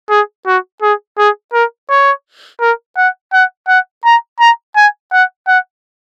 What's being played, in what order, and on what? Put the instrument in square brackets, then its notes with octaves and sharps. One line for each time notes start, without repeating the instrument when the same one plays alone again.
[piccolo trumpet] G#4
F#4
G#4
G#4
A#4
C#5
A#4
F#5
F#5
F#5
A#5
A#5
G#5
F#5
F#5